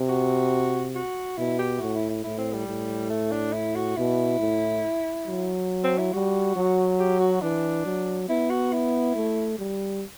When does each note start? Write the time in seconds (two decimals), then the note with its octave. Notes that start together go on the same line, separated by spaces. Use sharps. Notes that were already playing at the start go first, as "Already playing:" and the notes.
Already playing: C3
0.09 F#4
0.95 F#4
1.37 B2 E4
1.59 G4
1.77 E4
1.81 A2 F#4
1.95 E4
2.10 E4
2.24 A2 E4
2.38 C4
2.53 G3
2.67 A2
3.10 A3
3.32 D4
3.53 E4
3.75 F#4
3.97 B2 E4
4.40 A2
5.27 F#3
5.84 C4
5.98 E4
6.13 G3 F#4
6.56 F#3
7.00 G4
7.20 F#4
7.42 E3 D4
7.85 F#3
8.29 B3 E4
8.50 F#4
8.73 E4
9.15 A3
9.58 G3